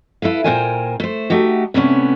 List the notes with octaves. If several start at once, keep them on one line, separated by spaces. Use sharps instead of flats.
E4 A4 B4 F5
A#2 F#3 A#4 C5 G5 G#5
A3 C5
A3 D#4 F#4 G4
A2 C3 A#3 B3 C#4 D4